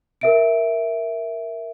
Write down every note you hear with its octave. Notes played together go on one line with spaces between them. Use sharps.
A#4 E5 D7